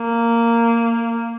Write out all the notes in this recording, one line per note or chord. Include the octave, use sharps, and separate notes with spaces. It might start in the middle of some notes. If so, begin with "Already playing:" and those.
Already playing: A#3